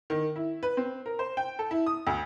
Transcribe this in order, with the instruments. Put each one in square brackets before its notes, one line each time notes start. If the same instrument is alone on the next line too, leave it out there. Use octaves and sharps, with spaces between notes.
[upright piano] D#3
E4
B4
C4
A#4
C5
G5
A4
E4
D#6
D2